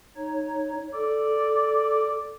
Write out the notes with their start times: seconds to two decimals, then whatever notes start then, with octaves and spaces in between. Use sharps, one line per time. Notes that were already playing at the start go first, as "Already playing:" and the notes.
0.17 D#4 C#5
0.94 A4 D5